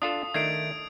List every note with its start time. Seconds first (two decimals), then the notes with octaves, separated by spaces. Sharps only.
0.02 D4 F4 A4 D#6
0.34 D#3 A3 D4 G#6 C7 D7